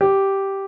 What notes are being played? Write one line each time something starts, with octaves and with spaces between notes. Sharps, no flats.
G4